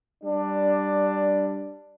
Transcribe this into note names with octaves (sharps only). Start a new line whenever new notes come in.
G3 D4